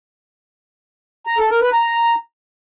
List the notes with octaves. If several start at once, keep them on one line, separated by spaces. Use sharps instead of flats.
A#5
A4
A#4
B4
A#5